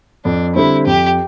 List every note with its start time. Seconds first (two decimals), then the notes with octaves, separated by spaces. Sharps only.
0.24 F2 D4
0.55 D3 G3 C4 E4
0.86 F2 G4